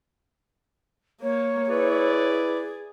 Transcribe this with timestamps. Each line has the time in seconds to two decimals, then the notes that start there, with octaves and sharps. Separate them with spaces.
1.22 A#3 C#5
1.70 E4 G#4 B4 D5